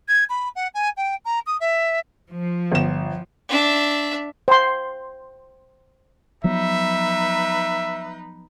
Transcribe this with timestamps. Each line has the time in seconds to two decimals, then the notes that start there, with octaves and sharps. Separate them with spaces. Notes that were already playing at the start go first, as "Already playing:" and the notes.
0.08 G#6
0.29 B5
0.56 F#5
0.74 G#5
0.97 G5
1.25 A#5
1.46 D#6
1.60 E5
2.31 F3
2.72 G1 E7
3.49 D4 E5
4.48 C5 C6
6.44 F3 F#3 B3 D#4 B4 E5